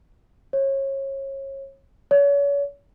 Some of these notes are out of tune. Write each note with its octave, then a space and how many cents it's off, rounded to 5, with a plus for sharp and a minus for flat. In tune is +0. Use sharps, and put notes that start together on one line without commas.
C#5 -30
C#5 +35